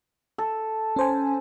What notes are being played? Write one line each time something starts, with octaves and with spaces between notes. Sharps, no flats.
A4
C#4 C5 G#5